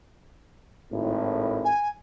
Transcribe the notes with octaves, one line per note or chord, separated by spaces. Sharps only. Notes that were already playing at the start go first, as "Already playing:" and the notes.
G#1 A2
G#5